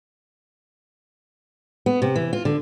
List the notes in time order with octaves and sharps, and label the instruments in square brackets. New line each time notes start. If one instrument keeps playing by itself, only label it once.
[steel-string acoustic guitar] B3
C3
E3
F4
D3